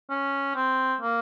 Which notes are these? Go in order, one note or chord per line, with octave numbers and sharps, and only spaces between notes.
C#4
C4
A#3